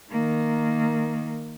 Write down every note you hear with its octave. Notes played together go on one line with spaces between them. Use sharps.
D#3 A#3